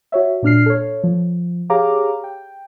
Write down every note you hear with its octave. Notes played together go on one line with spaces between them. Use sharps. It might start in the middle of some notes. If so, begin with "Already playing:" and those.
F#4 C#5 E5
A#2 D4 F6 C7
A4 C#5
F3
G4 G#4 C#5 F5 A#5 D6
G5